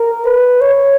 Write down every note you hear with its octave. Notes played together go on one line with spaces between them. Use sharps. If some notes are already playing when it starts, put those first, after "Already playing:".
Already playing: A#4
B4
C#5